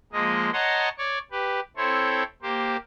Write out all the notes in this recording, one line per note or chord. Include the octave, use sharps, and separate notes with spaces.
F3 G#3 A#3 D#5
C#5 D#5 F#5 A5 A#5 C6
C#5 D5 C#6
G4 B4
C4 E4 A4 C5 C#5
A#3 G4 C5